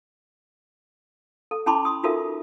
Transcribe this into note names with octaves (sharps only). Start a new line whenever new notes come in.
A4
C#4 E4 A5 B5 C6 D6
C6 D#6
D#4 F4 F#4 A4 A#4 E5